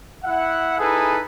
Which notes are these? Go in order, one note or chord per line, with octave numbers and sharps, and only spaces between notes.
E4 E5 F#5
D#4 E4 G#4 A4 B4